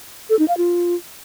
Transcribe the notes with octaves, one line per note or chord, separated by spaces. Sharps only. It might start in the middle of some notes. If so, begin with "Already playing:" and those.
A4
D#4
F5
F4